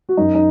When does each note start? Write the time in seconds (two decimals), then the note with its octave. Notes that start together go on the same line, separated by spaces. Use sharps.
0.09 F#4
0.17 F#2 D#4
0.35 D#4